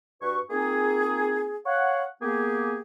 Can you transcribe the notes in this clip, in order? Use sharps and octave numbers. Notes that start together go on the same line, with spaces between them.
G2 F#4 G4 B4 C#6
A#3 C4 D#4 F4 G#4
C#5 F5 F#5
A#3 B3 G4 G#4